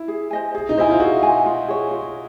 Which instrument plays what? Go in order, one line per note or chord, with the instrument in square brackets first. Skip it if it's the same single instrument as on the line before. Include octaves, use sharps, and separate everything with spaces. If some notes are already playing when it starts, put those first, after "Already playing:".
Already playing: [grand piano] E4
[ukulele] G#4
C5 D#5 G#5
G#4
[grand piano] D#4
[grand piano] E4 [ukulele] C5 D#5 G#5
[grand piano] F4
[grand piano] F#4 [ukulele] G#4
[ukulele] C5 D#5 G#5
F4
G#4 C#5
F4